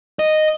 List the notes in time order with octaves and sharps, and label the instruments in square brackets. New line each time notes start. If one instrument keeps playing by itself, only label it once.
[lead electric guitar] D#5